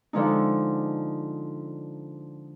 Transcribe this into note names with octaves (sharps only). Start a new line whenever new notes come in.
D3 F3 G#3 D#4